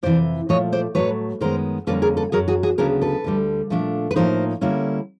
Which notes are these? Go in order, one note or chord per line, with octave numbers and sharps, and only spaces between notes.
F2 C3 E3 C5 D5
A#2 F3 A3 C#5 D#5
C5 D5
A2 F#3 A3 B4 C#5
F#2 D#3 G#3 B3 A#4 C5
F2 D3 G3 A#3 C#4 A4 B4
G#4 A#4
A4 B4
F#2 D#3 F#3 G#4 A#4
F#4 G#4
F#4 G#4
D2 C#3 F#3 B3 D4 G#4 A#4
A4 B4
D2 D3 G3
A#2 F3 A3 D4
B4
A2 F3 A#3 D#4 A#4 C5
D3 G3 A#3 C#4 E4